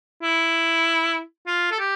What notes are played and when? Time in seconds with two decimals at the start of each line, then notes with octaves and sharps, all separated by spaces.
0.23 E4
1.47 F4
1.71 A4
1.79 G4